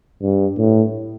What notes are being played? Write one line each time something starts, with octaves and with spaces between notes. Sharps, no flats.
G2
A2